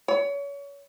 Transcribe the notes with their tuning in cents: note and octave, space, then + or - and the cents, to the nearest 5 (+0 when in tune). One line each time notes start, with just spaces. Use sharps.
C#5 +30